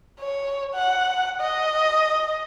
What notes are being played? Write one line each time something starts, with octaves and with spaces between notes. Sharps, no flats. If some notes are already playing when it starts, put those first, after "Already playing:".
C#5
F#5
D#5